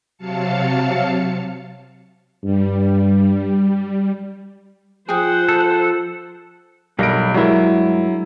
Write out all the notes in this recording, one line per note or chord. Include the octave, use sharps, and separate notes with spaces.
C3 F#3 F5 A5 C#7
G2 G3
F3 G#4 C5 F#5 G5
A4
B1 G2 G3 A#3 A#6 D7
G2 F#3 G#3 E4 A#4